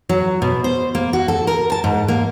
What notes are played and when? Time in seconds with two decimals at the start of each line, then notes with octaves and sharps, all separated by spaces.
0.09 F#3
0.42 B2
0.64 C5
0.95 A#3
1.13 F#4
1.28 A4
1.47 A#4
1.72 A5
1.84 G#2
2.08 A#3